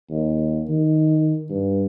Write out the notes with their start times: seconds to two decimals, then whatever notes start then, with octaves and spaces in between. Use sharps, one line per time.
0.10 D#2
0.69 D#3
1.50 G2